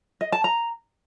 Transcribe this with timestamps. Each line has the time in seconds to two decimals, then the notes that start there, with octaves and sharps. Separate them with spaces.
0.21 D#5
0.32 A5
0.44 A#5